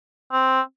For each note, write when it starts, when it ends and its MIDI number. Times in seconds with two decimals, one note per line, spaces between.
0.32 0.61 60